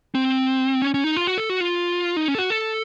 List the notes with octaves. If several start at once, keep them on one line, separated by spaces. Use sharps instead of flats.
C4
C#4
C#4
D#4
F4
F#4
A4
F#4
F4
D#4
C#4
A4
F#4
A4